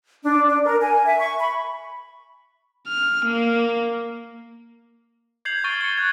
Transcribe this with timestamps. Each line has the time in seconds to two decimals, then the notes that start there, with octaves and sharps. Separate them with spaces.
0.24 D4
0.48 D4
0.65 A#4
0.81 G#5
1.06 E5
1.20 C#6
1.39 B5
2.88 F6
3.25 A#3
5.45 G6 G#6 C7 F7 F#7
5.64 C#6 F6 A6 D7 D#7 G7
5.81 C#7 D7 G7
5.98 F#6 G#6